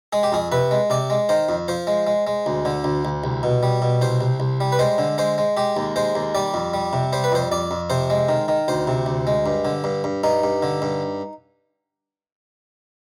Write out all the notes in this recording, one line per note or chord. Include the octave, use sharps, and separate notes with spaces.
G#3 G#4
G4
F2 G#4
C3 B4
G#3
C3 D5
G#3
D#3 C5
F2
F3 C5
G#3
G#3
G#3
D2
D3
D2
D2
C2
B2
G3
B2
C2 C5
C2
C2
G3
B4
G#3 C5
D3
G#3 C5
G#3
G#3 G4
D#2
G#3 C5
D#2
G3 D5
F2
G3
C3
G3 C5
B4
F2 C5
F2 D5
F2
C3 C5
G#3
D#3
D#3
D2 C5
C3
D2
G#3
G2
D3
G2
G2
G2 D#4
G2
D3
G2